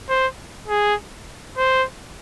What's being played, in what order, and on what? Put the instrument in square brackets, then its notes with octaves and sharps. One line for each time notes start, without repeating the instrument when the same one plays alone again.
[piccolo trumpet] C5
G#4
C5